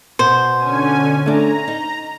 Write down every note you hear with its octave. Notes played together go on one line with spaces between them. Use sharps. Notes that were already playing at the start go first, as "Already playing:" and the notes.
B2 C5
D3 C#4 G#5
A3 D4 A#5
D#4